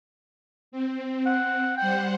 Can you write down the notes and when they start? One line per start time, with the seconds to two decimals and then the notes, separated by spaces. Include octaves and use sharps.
0.72 C4
1.26 F#5
1.77 G3 C5 F#5 G5